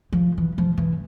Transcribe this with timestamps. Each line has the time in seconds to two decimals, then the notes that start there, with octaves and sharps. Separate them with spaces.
0.12 F3
0.38 E3
0.58 F3
0.78 E3